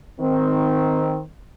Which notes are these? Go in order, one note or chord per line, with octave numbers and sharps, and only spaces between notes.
D#3 C4